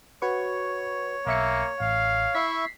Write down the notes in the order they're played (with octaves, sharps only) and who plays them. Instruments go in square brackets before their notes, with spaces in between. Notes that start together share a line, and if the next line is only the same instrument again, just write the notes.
[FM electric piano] F#4 B4 C#6 [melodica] C#5
[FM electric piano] B1 E5 C#7 [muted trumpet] A#3
[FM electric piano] A1 [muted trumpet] F5
[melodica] E4 E5 C#6 [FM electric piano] B6 C7